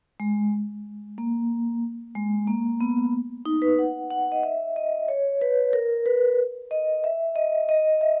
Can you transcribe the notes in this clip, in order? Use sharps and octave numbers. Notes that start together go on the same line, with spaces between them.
G#3
A#3
G#3
A#3
B3
D#4
B4
F#5
F#5
D#5
E5
D#5
C#5
B4
A#4
B4
D#5
E5
D#5
D#5
E5